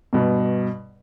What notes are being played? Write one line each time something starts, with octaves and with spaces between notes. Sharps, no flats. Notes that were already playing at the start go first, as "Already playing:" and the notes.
G2 B2